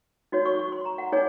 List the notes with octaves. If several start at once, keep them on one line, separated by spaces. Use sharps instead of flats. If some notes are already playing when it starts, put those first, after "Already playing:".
D#4 F#4 C#5
C#6
C#6
C6
A#5
F#5
D#4 G#4 C#5 G#5